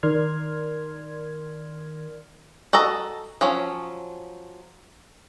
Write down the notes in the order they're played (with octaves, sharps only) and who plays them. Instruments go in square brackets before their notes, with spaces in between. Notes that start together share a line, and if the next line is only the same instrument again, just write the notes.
[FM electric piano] D#3 A#4 D5 C6 F6 G#6
[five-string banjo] F#4 A4 D#5 A#5
F3 F#3 C#4